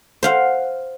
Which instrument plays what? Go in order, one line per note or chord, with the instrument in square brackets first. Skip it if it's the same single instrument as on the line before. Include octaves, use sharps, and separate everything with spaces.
[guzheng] C5 F5 F#5